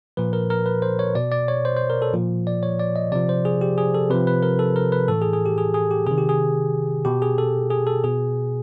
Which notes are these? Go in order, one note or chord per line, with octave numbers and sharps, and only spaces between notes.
A#2 F3 B4
A#4
A#4
B4
C5
C#5
B2 D5
D5
C#5
C5
C5
A#4
A4
A#2 F3
D5
C#5
D5
D#5
C3 F3 D5
C5
G#4
G4
G#4
A4
C3 F3 B4
B4
A#4
A4
A#4
B4
A2 E3 A4
G#4
G#4
G4
G#4
G#4
G4
C3 D#3 G#4
G4
G#4
B2 G4
G#4
A4
G#4
A4
B2 G#4